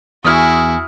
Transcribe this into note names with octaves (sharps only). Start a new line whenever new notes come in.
E2 C#4 E4 F#4 G#5 D#6 F6